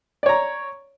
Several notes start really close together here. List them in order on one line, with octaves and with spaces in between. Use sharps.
D5 C#5 A#5